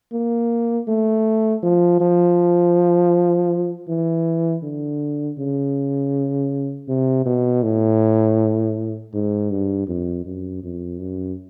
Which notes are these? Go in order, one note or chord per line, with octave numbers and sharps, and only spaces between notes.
A#3
A3
F3
F3
E3
D3
C#3
C3
B2
A2
G#2
G2
F2
F#2
F2
F#2